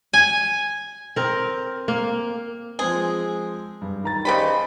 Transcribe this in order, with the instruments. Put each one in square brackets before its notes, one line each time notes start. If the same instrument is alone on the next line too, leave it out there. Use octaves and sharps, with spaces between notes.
[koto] G#5
[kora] C4 A#4
A#3
[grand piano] F3 G#3 C4 [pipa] G#4
[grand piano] G2
D#3 A#5 A6
[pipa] C#3 G3 B5 [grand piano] G4 C5 D#5